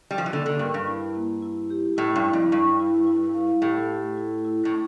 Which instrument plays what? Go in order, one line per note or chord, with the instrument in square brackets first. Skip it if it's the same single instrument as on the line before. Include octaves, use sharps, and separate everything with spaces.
[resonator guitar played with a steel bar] G3
F3
E3
[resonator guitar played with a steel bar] D3 [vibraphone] A#3
[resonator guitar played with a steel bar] D3
[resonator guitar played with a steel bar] G2 [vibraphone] A#4
[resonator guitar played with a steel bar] G2
[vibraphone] E4
A#3
E4
G4
[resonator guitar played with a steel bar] A2 [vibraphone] E4
[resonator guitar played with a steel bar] G2
[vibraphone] E4
[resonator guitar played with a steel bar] F2
[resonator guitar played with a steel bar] G2 [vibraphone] E4
[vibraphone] E4
E4
F5
[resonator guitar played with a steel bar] A2 [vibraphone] G4
[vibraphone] A3
E4
E4
[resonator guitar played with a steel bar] A2
[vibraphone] D4